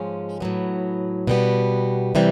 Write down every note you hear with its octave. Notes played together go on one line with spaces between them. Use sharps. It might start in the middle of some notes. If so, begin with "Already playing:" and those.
Already playing: G#2 F3 G#3 C#4
A2 F#3 B3
B2 G3 B3
C3 E3 G3